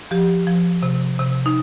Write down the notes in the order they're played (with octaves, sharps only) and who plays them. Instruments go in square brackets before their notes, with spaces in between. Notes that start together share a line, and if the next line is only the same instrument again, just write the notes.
[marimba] F3 G4
F3
C3
C3
D#4